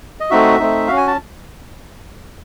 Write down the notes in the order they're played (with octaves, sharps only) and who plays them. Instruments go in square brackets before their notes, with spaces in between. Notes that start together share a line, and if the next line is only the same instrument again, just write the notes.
[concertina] D#5
A3 C4 D#4 F#4 E5
A3 C4 D#4
C#4 F#4 F5
G#5
A5